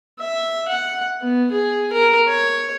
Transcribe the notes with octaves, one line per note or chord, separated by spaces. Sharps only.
E5
F#5
B3
G#4
A#4
C#5